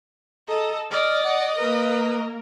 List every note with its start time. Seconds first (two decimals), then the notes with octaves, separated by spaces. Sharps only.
0.48 A4 D#5 A#5
0.91 D5 D#5 F6
1.24 F#5
1.57 A#3 A#4 B4